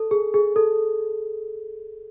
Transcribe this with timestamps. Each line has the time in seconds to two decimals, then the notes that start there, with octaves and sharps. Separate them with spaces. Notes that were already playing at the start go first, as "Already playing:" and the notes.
Already playing: A4
0.11 G#4
0.34 G#4
0.56 A4